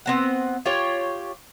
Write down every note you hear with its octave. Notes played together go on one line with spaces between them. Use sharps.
B3 C4 F#5
F4 G4 C#5